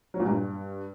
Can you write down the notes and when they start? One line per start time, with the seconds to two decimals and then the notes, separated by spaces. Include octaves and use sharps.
0.14 F#3
0.20 A#2
0.25 G2